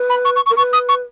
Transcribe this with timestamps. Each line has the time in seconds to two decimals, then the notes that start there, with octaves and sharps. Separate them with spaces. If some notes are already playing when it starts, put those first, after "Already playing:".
Already playing: B4
0.09 B5
0.25 C#6
0.36 C#6
0.46 C#6
0.50 A#4
0.57 B4 C#6
0.73 D#6
0.89 C#6